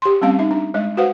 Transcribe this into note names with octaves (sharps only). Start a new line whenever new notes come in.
G4 C6
G3 A3 C4 C#4 F5
D#4 E5
D4
G#3 D#5
F#4 B4 C5 F5 F#5